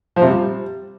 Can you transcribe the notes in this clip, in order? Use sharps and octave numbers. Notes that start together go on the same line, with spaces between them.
F3
C3
G3